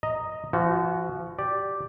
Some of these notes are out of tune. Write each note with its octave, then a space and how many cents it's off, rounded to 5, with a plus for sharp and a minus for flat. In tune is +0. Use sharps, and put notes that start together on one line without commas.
D#5 +0 A#5 +0
F3 -35 F#4 +0
G4 +0 D5 +0